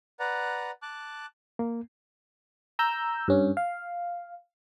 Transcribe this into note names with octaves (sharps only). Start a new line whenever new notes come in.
B4 D5 F#5 A#5
A5 D6 F#6
A#3
A#5 E6 G6
G2 C#4
F5